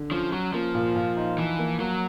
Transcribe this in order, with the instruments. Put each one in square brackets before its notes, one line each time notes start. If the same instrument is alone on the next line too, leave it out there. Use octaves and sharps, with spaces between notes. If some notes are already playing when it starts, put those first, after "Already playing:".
Already playing: [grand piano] D3
[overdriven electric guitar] F3 [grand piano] C#4
[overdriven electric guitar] F#3 [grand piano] C#4
[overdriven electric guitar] F3 [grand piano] A#3
[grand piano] A#2
A#2
D#4
[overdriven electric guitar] E3 [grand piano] F3
[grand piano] A#3
[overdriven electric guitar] F#3 [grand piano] A#3